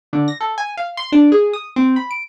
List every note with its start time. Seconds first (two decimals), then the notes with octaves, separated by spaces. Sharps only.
0.13 D3
0.28 A#6
0.41 A4
0.58 G#5
0.77 F5
0.97 C6
1.12 D4
1.32 G#4
1.53 D#6
1.76 C4
1.96 B5
2.11 D7